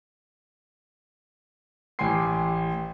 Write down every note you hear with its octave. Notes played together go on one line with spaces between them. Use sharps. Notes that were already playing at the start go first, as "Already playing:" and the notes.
A1 G4 G5 G#5 C6 C7